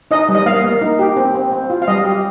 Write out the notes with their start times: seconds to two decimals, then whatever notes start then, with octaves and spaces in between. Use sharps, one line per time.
0.11 D#4 D#5
0.29 G3
0.35 D#5
0.46 A#3 F5
0.64 A#3
0.81 D#4
0.99 G4
1.17 C4
1.34 C4
1.51 C4
1.70 F4
1.82 F5
1.88 G3 D#5
2.04 G4